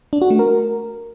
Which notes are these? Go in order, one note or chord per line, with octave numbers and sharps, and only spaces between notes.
D4
F#4
A3
A#4